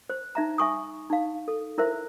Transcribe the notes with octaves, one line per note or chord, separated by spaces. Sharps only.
C5
D#4 E5 A#5
E5 G#5 C#6 D#6
D#4 F5
A4
E4 A#4 C5 E5